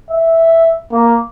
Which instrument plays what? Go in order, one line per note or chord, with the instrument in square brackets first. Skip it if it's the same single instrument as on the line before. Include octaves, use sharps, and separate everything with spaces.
[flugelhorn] E5
A#3